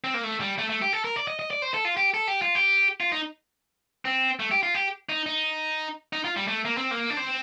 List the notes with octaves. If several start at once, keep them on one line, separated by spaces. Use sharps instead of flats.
C4
A#3
A3
G3
A3
A3
G4
A4
A#4
D5
D#5
D#5
D5
C5
A4
F4
G4
A4
G4
F4
G4
F4
D#4
C4
A3
G4
F4
G4
D#4
D#4
D#4
F4
G3
A3
A#3
C4
A#3
D4
C4